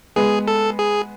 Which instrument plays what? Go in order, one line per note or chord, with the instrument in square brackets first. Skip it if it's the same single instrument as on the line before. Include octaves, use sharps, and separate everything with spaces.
[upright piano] G#3 B3 [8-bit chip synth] G#4
[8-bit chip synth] A4
G#4